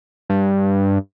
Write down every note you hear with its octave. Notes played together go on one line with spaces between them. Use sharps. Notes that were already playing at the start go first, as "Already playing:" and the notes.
G2